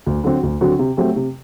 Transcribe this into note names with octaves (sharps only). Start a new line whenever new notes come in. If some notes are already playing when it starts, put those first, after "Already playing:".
D2
D3 F#3 C4 F#4
D2
D3 F#3 C4 F#4
C3
F#3 A3 C4 G4
C3